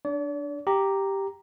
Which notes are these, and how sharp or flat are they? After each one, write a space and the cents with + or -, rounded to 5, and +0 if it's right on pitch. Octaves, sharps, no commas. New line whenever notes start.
D4 +0 D5 -40
G4 +0 A#5 +0